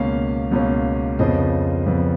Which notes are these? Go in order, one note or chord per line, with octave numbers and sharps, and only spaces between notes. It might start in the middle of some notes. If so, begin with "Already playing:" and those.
Already playing: C#2 B2 A#3 C#4 F5
C#2 B2 A#3 C#4
F2 C#3 F3 B3 D#5
F2 C#3 F3 B3